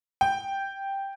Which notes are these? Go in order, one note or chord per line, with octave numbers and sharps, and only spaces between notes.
G5